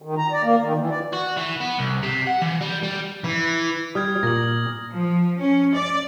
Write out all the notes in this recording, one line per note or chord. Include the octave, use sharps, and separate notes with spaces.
D#3
A#5
D5
A#3
D#3
E3
D5
F#4
E3
B3
C2
C3
F#5
E3
G3
G3
E3
G3 D#6 F6 G#6
A#2 A#6 F#7
F3
C#4
D5